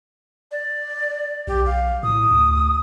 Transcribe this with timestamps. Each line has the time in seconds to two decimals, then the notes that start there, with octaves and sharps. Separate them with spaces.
0.51 D5
1.47 B1 G4
1.66 F5
2.03 A2 D#6
2.31 D2